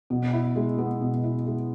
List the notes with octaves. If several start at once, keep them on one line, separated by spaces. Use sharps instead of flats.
B2
E4
G#3
B3
B2
E4
G#3